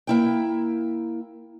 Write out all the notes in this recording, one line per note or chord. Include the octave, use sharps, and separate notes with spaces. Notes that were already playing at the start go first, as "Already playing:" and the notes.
A#3 E4 G5